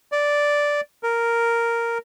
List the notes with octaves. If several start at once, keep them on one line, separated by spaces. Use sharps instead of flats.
D5
A#4